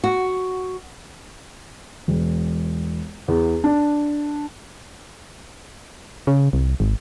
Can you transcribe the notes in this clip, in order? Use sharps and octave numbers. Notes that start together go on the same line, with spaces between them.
F#4
E1
E2
D4
C#3
C2
G#1